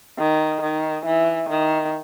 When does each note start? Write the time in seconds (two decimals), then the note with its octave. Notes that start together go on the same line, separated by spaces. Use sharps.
0.19 D#3
0.62 D#3
1.06 E3
1.49 D#3